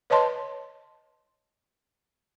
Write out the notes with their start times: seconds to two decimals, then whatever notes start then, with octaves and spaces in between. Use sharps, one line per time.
0.10 B4 C#5 D#5 A5 C6